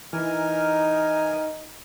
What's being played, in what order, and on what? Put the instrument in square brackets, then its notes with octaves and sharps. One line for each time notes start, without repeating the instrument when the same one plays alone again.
[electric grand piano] E3 [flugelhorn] D#4 [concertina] A#4 G#5 F6